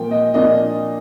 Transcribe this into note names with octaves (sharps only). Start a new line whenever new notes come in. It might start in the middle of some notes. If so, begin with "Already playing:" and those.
Already playing: A#2 F3 A#3 G5
D#5
A#2 F3 A#3 D4 D#5